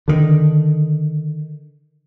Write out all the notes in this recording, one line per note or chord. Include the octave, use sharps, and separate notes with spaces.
D3 D#3